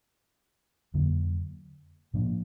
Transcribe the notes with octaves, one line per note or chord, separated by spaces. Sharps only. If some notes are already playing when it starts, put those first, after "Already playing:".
F2 D3 F#3 A#3
A2 F3 A#3 D4